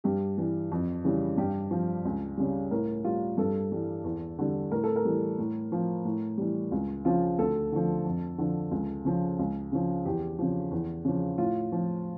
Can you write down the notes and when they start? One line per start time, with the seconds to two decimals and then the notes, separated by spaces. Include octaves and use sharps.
0.04 G2 G4
0.38 E3 G3
0.71 F2
1.04 C#3 E3 G3
1.38 G2 G4
1.71 F3
2.05 C#2
2.37 C#3 G3
2.71 A2 A#4
3.05 G3 F4
3.38 G2 A4
3.71 E3 G3
4.04 E2
4.38 D3 G3
4.71 A2 A#4
4.84 A4
4.96 A#4
5.05 E3 G3
5.38 A2
5.72 F3
6.05 A2
6.38 E3 G3
6.72 C#2
7.05 C#3 F3 F4
7.38 D2 A4
7.72 D3 F3
8.06 F2
8.38 D3 F3
8.71 C#2
9.05 C#3 F3
9.39 C#2
9.72 C#3 F3
10.05 E2 G4
10.39 C#3 F3
10.71 E2
11.05 C#3 F3
11.38 A2 F4
11.72 F3